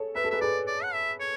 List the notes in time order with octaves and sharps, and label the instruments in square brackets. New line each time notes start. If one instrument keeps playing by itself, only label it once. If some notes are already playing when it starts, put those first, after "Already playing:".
Already playing: [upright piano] G#4 A4 C#5
[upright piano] B4 [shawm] E5
[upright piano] A4
[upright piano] G#4 B4 [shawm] E5
[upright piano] G#4 B4 [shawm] D5
[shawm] D5
F#5
E5
C#5